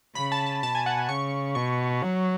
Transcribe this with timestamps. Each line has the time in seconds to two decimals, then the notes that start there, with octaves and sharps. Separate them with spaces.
0.15 C#3 B5
0.32 A5
0.46 A5
0.63 B2 A5
0.75 G#5
0.86 F#5
0.98 G#5
1.09 C#3 C#6
1.55 B2 C#6
2.02 F#3